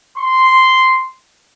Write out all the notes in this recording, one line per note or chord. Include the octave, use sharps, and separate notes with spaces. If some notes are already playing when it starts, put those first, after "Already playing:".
C6